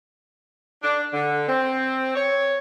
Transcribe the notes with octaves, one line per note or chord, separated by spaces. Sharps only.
D4
D3
C4
C#5